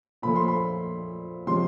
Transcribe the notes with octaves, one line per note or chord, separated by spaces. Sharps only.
A#2 F3 A3 B5
C6
B5
C3 F3 G#3 C#4 C6